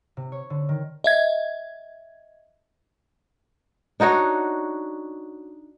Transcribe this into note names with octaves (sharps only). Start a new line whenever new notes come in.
C3
C#5
D3
D#3
D#5 E5 G#6
D4 D#4 F#4 C#5